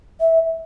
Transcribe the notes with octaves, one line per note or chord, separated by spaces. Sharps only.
E5